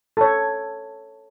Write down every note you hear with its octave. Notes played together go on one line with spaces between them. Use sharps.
A4 C#5